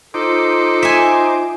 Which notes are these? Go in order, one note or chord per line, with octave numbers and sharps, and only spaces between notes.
D#4 F4 A4 C5 D6
E5 G#5